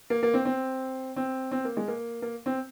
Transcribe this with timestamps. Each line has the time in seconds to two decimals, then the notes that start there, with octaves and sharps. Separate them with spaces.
0.10 A#3
0.23 A#3
0.34 C4
0.45 C4
1.16 C4
1.51 C4
1.65 A#3
1.77 G#3
1.88 A#3
2.22 A#3
2.46 C4